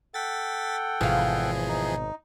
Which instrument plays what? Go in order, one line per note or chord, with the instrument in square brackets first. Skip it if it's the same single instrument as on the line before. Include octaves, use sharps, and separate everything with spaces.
[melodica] A4 F#5 G5 [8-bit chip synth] A6 B6
[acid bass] G#1 [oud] B2 F5 [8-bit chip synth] E3 F3 G#4
[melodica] D#4